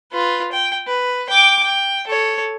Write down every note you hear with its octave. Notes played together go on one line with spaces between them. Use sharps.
F4 B4
G5
B4
G5 D6
G5
A4 C#5